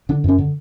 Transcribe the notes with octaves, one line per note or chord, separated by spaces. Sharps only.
D3 D4
F#2 C#4
D3